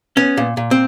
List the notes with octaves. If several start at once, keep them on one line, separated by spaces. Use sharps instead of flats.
B3 C#4
A#2
A#2
C4